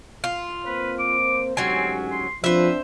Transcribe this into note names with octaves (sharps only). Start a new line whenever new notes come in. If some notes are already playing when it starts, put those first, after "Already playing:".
F4
A#3 C4 B4 C5
D6
D2 G#2 F#3 C4 C#4 G4 G#5
C6
F3 C4 D4 B4 C5 E5